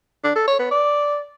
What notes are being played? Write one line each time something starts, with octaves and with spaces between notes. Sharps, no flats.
D4
A4
C#5
B3
D5